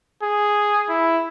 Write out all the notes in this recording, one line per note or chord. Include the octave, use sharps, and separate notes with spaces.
G#4
E4